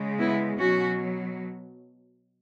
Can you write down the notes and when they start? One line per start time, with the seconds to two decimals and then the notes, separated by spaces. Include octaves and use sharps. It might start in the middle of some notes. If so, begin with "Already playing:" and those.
Already playing: C#3 G#3
0.18 B3 E4
0.59 B2 F#3 C#4 F#4